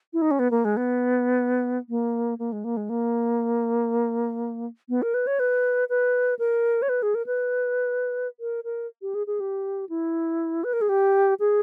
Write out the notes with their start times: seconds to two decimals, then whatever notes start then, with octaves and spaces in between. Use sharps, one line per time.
0.13 E4
0.22 D#4
0.31 C#4
0.39 B3
0.51 A#3
0.65 G#3
0.77 B3
1.89 A#3
2.39 A#3
2.52 G#3
2.64 A#3
2.77 G#3
2.89 A#3
4.89 B3
5.02 A#4
5.14 B4
5.27 C#5
5.39 B4
5.89 B4
6.39 A#4
6.82 C#5
6.89 B4
7.03 G#4
7.15 A#4
7.26 B4
8.40 A#4
8.64 A#4
9.02 G4
9.14 G#4
9.27 G#4
9.40 G4
9.89 E4
10.64 B4
10.73 A#4
10.81 G#4
10.89 G4
11.40 G#4